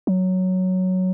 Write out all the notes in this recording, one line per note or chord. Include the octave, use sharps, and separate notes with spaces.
F#3